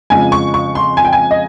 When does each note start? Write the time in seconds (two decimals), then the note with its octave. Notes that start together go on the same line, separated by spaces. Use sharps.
0.10 F2 C#3 F3 G#3 G#5
0.32 C#6
0.54 C#6
0.75 C6
0.97 G#5
1.05 G5
1.13 G#5
1.31 D#5